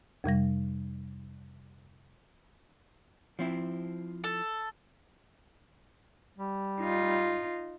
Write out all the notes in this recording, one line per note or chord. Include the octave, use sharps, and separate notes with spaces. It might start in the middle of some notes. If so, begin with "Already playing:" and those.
F2 C3 G3 A#6
F3 C4 E4
A4
G3
D#4 F4